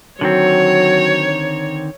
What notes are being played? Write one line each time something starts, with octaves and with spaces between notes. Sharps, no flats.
D3 D#3 F#3 C4 C#5